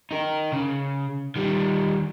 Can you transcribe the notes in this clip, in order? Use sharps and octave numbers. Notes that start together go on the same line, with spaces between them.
D#4 A#4
C#3
D#3 G3